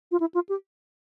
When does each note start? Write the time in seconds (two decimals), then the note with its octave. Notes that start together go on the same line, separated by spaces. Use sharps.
0.11 F4
0.20 E4
0.34 F4
0.49 G4